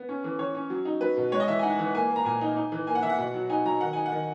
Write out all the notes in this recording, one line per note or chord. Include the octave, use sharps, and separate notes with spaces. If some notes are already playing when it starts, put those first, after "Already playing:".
Already playing: B3
C#4
E3
E3 C#5
C#4
F#3
D#4
F#3 B4
B2
G#3 C#5
D#5
E3 E5
G#5
D#4 F#5
E3
A#3 G#5
A#3
A#5
A#2 G#5
D#4
D#4
E3
A#3 G#5
F#5
E3 E5
F#5
B2
F#3
D#4 G#5
F#3 A#5
D#3 F#5
D#4 G#5
F#5
D#3